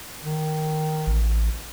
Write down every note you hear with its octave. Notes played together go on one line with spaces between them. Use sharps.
D#3
A1